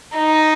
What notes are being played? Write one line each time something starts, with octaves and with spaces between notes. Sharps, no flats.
D#4